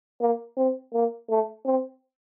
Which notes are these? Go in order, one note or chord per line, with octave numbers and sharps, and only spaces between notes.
A#3
C4
A#3
A3
C4